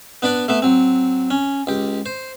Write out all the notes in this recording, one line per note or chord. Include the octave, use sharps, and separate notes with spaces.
B3 D4 B4 D5
A3 B3 E5
F#3 C4
C#4
C#2 G4
C5